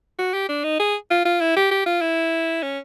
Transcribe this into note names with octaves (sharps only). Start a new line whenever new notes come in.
F#4
G4
D4
D#4
G#4
F4
F4
E4
G4
G4
F4
E4
C#4